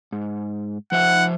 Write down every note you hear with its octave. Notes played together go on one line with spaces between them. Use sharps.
G#2
F3 C5 E5 F#5